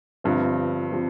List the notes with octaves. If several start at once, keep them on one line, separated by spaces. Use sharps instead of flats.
G1 G2 F3 C4
F3 C4